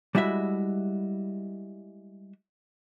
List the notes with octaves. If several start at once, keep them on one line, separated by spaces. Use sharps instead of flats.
G3 G#3 E4 F#4 E5